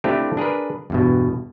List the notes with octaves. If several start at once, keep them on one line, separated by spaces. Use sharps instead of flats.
A3 C4 D4 E4 F4 G4
D4 G#4 A#4 B4
E2 G2 B2